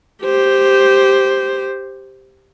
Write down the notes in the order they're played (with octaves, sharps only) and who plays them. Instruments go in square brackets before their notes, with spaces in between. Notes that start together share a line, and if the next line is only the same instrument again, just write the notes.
[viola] G4 C5